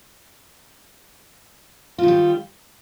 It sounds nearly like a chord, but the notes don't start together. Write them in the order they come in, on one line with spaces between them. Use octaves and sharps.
F4 D#3 G3